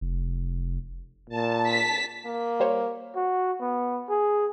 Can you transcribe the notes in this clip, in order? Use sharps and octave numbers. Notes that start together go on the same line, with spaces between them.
F1
A#2 A5
B6
A#3
G3 C5 C#5
F#4
B3
G#4